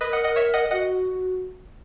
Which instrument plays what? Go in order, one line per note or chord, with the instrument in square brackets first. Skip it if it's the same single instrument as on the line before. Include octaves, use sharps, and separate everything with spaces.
[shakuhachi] A#4 [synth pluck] B4 D#5
[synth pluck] D#5 F#5
D#5 F#5
C#5 E5
D#5 F#5
[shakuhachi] F#4 [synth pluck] D#5 F#5